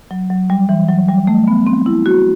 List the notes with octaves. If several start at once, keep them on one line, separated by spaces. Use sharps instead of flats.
F#3
F#3
G3
E3
F#3
G3
A3
B3
C4
E4
F#4